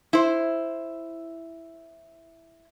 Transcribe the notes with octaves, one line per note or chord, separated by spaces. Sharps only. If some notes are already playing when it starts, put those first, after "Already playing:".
E4 C5